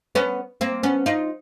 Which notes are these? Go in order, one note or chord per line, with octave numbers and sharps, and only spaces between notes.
B3 C#4
A#3 C4
B3 C#4
D#4 F4